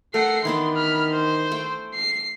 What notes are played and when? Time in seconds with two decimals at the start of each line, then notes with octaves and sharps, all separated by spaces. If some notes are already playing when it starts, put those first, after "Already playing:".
0.14 A3 A#4 F#5 C7
0.45 D#3 E3 B3 D4 C6
0.76 B5 F6
1.12 C5
1.51 A3 G5
1.95 C7